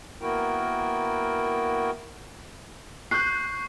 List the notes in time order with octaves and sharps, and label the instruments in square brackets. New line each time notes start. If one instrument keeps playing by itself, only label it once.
[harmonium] A#3 B3 E4 F#4 A#4 G5
[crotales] C#6 C7 [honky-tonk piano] F#6 G6